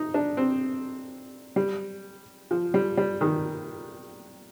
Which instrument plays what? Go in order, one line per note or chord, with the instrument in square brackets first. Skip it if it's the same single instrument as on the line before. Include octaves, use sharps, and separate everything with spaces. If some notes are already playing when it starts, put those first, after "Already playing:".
Already playing: [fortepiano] D#4
D4
C4
G3
F3
G3
G3
D#3